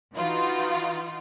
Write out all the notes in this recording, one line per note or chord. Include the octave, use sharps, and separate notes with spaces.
E3 D#4 F4 F#4